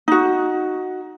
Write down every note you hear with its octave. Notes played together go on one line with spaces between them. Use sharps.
D#4 F#4